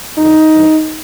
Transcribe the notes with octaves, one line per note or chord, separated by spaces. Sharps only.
F2 D3 D#4
G2 E3